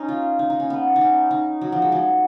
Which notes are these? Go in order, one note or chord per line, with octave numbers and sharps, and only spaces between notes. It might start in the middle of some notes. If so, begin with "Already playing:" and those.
Already playing: C#4 D#4
F4
D#4
D#4
C#4
B3
D#4
C#4
D#4
F#3
F3
G#3
F#3